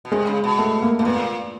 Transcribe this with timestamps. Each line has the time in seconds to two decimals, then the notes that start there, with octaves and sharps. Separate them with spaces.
0.05 B2
0.12 C3 G#3
0.27 C#3
0.44 B2
0.59 A3
0.82 A#3
0.99 B2 A#3
1.05 A#2 B3